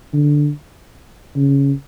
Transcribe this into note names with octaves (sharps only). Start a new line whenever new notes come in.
D3
C#3